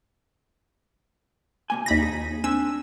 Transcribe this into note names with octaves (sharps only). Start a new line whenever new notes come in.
B2 A#3 G#5
D#2 A#2 B5 A#6
D#4 G#4
C4 D4 G#5 E6